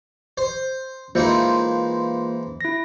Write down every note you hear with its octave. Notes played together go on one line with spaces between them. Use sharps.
C5
E3 G#3 A#3 D#4 F4 C5
E4 A#6